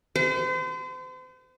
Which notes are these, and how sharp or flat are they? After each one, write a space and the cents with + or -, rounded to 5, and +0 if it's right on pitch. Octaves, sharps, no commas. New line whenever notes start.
C5 -40